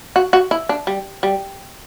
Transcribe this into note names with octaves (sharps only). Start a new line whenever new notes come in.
F#4
F#4
E4
D4
G3
G3